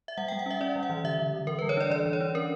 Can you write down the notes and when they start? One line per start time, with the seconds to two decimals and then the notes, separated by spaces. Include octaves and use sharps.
0.08 E5
0.17 G3 F#5
0.28 G3 G5
0.39 F#5
0.46 C#4 E5
0.61 C#4 D5
0.76 G3
0.83 F#5
0.90 E3
1.04 D3 E5
1.19 D3
1.33 D3
1.47 E3 A#4
1.59 G3 B4
1.69 C#5
1.77 D4 D5
1.90 E3 D5
2.06 E3
2.13 C#5
2.21 D4
2.35 C#4 A#4